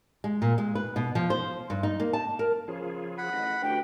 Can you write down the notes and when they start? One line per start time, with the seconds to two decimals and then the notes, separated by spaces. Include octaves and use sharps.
0.24 G#3
0.42 A#2
0.58 G#3
0.75 B4
0.96 B2
1.15 F3
1.30 C5
1.70 G2
1.83 D#4
2.00 A#3
2.13 A5
2.39 A#4
2.68 C#3 F3 F4 G#4
3.18 F#5 B5
3.33 A1 D#5
3.62 D2 F#4 G4 B4 G5